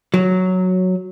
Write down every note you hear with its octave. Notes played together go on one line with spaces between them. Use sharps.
F#3